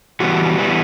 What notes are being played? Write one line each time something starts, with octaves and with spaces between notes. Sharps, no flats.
E3 G3 B3 F#4
E3 G3 B3